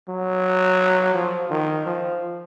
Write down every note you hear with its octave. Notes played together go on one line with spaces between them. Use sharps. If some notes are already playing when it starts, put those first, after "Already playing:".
F#3
F3
D#3
F3